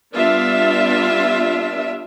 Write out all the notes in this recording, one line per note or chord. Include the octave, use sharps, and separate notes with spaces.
G3 B3 D4 F4 E5